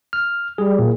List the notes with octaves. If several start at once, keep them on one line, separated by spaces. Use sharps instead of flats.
F6
G3 G#4
A#2